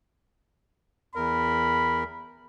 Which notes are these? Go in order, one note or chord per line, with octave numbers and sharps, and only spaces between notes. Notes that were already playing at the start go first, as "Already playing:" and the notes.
E2 A#4 B5